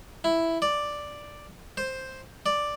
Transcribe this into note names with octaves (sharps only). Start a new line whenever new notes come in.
E4
D5
C5
D5